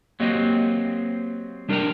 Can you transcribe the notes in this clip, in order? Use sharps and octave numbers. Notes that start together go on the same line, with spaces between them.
F#3 A#3 C4 G4 D#5
G3 D4 A#4 D#5 G5 A#5